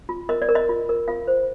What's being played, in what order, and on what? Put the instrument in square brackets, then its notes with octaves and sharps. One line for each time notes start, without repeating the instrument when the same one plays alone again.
[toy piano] F4
A#4 D#5
D5
A#4
D#5
F4
A#4
F4 F5
C5